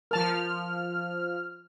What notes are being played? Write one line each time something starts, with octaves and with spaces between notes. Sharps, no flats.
F3 A#4 A5 F6